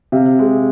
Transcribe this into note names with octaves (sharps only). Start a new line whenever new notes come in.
C3 F5
G#3